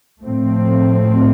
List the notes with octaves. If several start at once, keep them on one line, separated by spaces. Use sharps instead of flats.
A2 F3 A3 C4